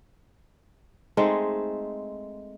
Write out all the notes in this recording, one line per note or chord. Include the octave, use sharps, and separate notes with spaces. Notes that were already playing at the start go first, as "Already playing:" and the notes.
G#3 A3 C4 D#4